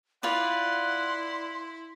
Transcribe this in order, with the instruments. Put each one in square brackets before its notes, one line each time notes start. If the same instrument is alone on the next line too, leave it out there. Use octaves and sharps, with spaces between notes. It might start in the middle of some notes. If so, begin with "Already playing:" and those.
[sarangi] E4 [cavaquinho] F4 B4 D5 [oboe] F#5 [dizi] C6